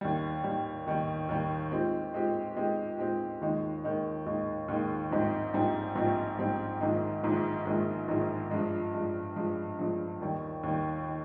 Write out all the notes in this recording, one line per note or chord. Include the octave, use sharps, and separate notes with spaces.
D#2 D#3 G3
D#2 D#3 G3
D#2 D#3 G3
D#2 D#3 G3
A#2 G#3 C4 D#4 G4
A#2 G#3 C4 D#4 G4
A#2 G#3 C4 D#4 G4
A#2 G#3 C4 D#4 G4
D#2 D#3 G#3 D#4
D#2 D#3 G#3 D#4
D#2 D#3 G#3 D#4
D#2 D#3 G#3 D#4
A#1 G#2 G3 C4 D#4
A#1 G#2 G3 C4 D#4
A#1 G#2 G3 C4 D#4
A#1 G#2 G3 C4 D#4
A#1 G#2 D#3 G#3
A#1 G#2 D#3 G#3
A#1 G#2 D#3 G#3
A#1 G#2 D#3 G#3
G2 F3 G#3
G2 F3 G#3
G2 F3 G#3
G2 F3 G#3
D#2 D#3 G3
D#2 D#3 G3
D#3